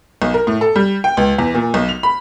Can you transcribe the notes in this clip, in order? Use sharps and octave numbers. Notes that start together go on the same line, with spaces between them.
B1
A#4
A2
A4
G3
G5
C#2
E2
A#2
B1
F7
B5